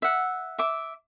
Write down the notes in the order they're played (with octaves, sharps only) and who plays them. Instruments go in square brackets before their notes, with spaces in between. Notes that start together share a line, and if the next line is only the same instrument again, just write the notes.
[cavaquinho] E5 F#5
E5 D6